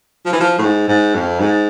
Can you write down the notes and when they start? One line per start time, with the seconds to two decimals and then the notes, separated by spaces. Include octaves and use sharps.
0.25 F3
0.32 E3
0.40 F3
0.58 A2
0.63 G#2
0.88 G#2
1.15 F2
1.40 G#2